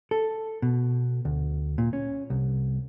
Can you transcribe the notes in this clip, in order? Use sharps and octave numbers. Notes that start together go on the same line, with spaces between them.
A4
B2
D2
A#2
C#4
C2